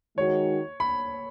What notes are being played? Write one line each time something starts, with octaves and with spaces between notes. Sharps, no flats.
D#3 G#3 D#4 F#4 C#5
B5